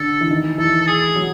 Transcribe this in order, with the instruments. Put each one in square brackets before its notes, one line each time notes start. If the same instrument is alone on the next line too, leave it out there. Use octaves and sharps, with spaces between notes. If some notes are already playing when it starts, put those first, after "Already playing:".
Already playing: [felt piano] D3 [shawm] A4
[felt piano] E3
D#3
[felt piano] E3 [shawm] A4
[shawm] A4
G#4
[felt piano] F#3